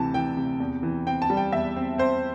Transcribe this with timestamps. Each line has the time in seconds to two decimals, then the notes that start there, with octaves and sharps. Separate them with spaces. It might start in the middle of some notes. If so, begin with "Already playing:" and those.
Already playing: D2 C3 E3 A5
0.14 E3 G5
0.37 C3
0.60 E2
0.83 E3
1.07 C4 G5
1.22 A5
1.30 G3
1.37 G5
1.52 E2 E5
1.76 C4
1.98 C4 C5